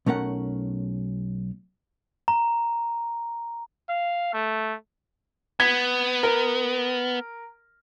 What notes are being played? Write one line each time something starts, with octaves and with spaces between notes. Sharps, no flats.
B1 A3 C#4 A#4 F#5
A#5
F5
A3
B3 G#6 B6
A#4